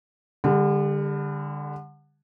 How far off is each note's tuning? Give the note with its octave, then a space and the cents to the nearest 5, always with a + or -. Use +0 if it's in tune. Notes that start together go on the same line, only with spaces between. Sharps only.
D3 +0 G3 +40